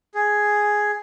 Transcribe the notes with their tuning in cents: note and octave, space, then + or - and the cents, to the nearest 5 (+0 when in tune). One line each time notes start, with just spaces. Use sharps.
G#4 +5